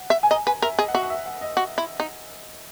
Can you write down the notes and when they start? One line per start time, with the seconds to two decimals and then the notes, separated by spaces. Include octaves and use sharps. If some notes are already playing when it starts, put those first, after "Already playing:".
Already playing: F#5
0.10 E5
0.23 G#5
0.31 D#5 A#5
0.47 B4 G#5
0.62 A#4 E5
0.79 G#4 D#5
0.88 F#5
0.94 F#4 E5
1.03 F#5
1.10 E5
1.26 F#5
1.41 D#5
1.57 F#4
1.78 E4
2.00 D#4